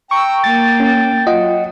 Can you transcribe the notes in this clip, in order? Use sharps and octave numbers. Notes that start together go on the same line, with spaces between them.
G5 A#5 C#6 E6
A#3 A6
C#4
F#3 F4 D#5 F#5